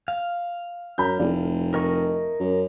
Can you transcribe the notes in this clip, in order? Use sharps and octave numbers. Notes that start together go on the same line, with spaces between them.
F5
F#2 A#5 B5 G6
F1 A3 E4 D5
A#4 D#5 C#6
F#2